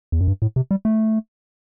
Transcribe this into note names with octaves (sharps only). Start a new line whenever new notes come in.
E2
F#2
G2
A2
C3
G3
A3